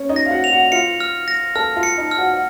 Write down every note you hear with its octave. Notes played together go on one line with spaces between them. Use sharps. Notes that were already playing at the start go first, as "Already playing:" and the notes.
Already playing: C#4 C#5
D#4 D#5
A#6
F5
F#4 F#5
F7
F#4 F#5
F4 F5 C#7
F6
A#6
A4 A5 F6
F4 F5
C#7
D#4 D#5
F6
F#4 F#5
F#5